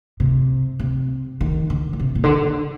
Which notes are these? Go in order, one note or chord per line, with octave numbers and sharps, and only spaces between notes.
C3
C3
D#3
D3
D3
C3
A#2
D3